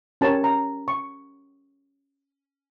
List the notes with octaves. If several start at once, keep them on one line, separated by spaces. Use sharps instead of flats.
C#4 G4 A#4 C#5 A5
A#5
C#6